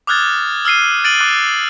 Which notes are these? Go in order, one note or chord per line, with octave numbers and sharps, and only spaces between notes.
D6 D#6 F6 F#6 G#6 A6
E6 F6 C7 D#7
F#6 A6 D7 D#7 F#7
D6 F#6 A6